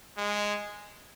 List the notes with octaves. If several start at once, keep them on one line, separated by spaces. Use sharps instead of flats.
G#3